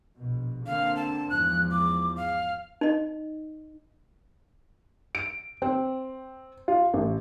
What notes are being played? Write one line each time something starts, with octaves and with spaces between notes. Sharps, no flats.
A#1 B2
D3 A#3 C4 F5
A5
E2 G#2 F3 F#6
D6
F5
D#4 D#5
D7
C4
F4
A1